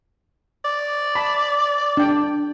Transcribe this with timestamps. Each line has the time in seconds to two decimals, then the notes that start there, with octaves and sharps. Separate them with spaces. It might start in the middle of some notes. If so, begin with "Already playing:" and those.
0.65 D5
1.15 A5 B5
1.97 D4 G5